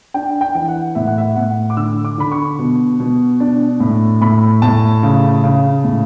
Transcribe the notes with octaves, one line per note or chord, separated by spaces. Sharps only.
D4 G5
G5
E3
F#5
A2 E5
F#5
E5
A2 F#5
D6
D3 E6
D6
D3 B5
C#6
B2
B2
D4
A2
A2 B5
A2 A5
C#3
C#3
A2